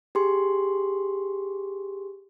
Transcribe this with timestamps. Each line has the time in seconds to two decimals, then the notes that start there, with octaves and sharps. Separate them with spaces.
0.15 G4 G#4 C6